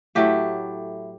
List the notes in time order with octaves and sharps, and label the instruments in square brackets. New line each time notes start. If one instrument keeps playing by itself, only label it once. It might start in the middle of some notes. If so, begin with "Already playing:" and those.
[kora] A2 F#3 A3 E4 G4